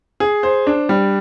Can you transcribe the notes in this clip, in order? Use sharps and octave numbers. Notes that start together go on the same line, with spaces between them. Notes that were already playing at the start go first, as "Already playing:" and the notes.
G#4
C5
D4
G3